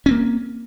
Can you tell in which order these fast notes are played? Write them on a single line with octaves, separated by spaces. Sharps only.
C#4 C4 A#3